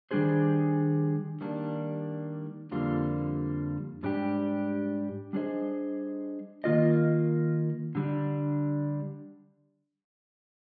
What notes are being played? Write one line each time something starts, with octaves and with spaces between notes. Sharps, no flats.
D#3 G3 D4 G#4 C5
D#3 G3 A#3 D4
F2 D3 G3 A#3 F4
G#2 G3 D4 G4
G3 D4 G#4 C5 D#5
D#3 A#3 F4 A#4 D#5
D3 G3 D4